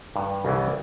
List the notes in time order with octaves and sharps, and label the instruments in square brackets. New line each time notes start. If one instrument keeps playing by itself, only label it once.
[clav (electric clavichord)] G2
C2 C#3 E3